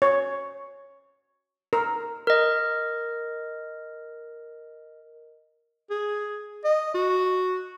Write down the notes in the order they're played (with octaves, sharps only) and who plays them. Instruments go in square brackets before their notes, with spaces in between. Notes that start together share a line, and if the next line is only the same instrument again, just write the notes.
[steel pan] C#5
A#4
[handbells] A#4 D#5
[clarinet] G#4
D#5
F#4